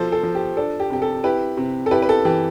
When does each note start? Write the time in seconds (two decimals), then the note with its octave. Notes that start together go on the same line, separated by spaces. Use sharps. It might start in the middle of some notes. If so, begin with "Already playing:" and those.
Already playing: B2 F3 A4 C5
0.12 A4
0.23 F3
0.35 G4
0.57 D4 A4
0.80 G4
0.90 C3 G4
1.02 A4
1.24 E4 G4 B4
1.57 C3
1.86 A4
1.91 E4 G4 B4
2.02 B4
2.09 A4
2.25 E3 G4